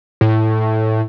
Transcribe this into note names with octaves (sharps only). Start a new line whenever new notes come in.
A2